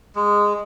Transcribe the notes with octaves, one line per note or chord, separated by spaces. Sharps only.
G#3